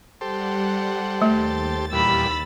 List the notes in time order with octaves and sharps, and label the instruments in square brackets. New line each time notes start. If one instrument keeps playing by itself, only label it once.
[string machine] G3 F#5 [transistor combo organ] G4 A4 C5
[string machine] D#2 A6 [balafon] A3
[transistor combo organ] E2 A#2 G3 [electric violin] B5 E6